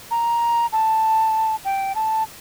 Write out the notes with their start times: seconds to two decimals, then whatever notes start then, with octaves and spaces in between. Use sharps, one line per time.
0.11 A#5
0.73 A5
1.65 G5
1.95 A5